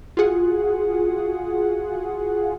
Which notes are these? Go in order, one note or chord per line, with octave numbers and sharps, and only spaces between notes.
F4 F#4 G#4 F#5